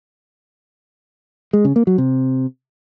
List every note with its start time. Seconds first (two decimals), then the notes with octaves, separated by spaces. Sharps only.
1.53 G#3
1.65 C#3
1.76 A#3
1.87 F#3
1.98 C3